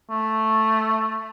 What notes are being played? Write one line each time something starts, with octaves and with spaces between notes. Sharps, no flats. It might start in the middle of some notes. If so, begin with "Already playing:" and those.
A3